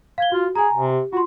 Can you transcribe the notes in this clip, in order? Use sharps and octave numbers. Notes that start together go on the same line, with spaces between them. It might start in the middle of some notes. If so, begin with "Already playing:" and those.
F5 G#6 G7
F4 F#4
G#4 G#5 A#5
C3
G4
F4 F#4 C6